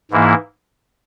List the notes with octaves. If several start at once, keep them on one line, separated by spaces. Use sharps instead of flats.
G#2 E3 A#3 E4